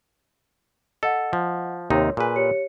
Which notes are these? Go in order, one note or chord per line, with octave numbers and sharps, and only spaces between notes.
A4 D#5 F#5
F3
D#2 C3 D#4 C#5 C6
A#2 G#4 B4 G#5
G4 C#5 C#7